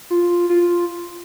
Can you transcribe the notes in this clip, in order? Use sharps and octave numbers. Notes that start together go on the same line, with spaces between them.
F4
F4